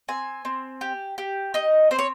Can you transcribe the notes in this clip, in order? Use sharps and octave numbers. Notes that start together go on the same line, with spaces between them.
C4 G#5
C4
G4
G4
D#4 D#5
C4 C5
C#5